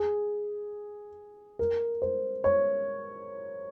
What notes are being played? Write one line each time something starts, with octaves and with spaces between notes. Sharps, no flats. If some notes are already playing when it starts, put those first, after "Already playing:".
Already playing: G#4
A#4
C5
C#5